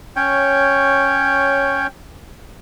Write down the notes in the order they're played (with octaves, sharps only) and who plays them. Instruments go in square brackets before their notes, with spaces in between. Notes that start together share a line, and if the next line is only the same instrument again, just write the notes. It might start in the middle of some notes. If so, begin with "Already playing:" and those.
[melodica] C#4 C#5 G5